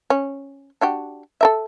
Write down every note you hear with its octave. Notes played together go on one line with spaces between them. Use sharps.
C#4
D4 F#4 G4
A4 A#4 E5